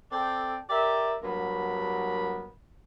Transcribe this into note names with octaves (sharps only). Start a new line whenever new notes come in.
C4 A4 D5 G5
G4 A#4 D5 E5
G2 F#3 A#3 B3 B5